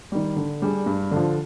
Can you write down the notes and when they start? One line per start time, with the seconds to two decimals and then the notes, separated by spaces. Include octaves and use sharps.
0.12 D#3 G3
0.36 D3
0.62 G3 D4 G#4
0.86 G2
1.11 D3 F3